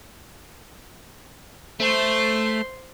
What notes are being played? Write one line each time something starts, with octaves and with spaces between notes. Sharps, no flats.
A3 C5 C6